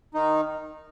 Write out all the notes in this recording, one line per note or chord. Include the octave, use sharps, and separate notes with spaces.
D#3 D#4